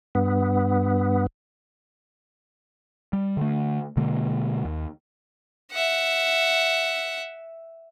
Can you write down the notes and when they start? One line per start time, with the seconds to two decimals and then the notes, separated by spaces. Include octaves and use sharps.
0.15 G2 B3
3.13 G3
3.37 D3 A3
3.97 B2 D3 G#3 A#3
4.65 D#2
5.72 E5 F#5